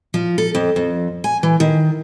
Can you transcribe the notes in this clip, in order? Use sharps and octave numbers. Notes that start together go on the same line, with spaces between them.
F3
A4
F2
F2
G#5
E3
D#3